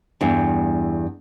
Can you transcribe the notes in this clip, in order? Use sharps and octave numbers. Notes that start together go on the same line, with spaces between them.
E2 G2